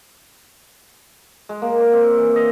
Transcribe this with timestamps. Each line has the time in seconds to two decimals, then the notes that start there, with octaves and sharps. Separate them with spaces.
1.49 G#3
1.62 A#3
1.80 D5
1.93 C4
2.18 E3
2.36 D#5